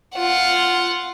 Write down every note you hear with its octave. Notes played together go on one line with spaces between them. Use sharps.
F4 F#5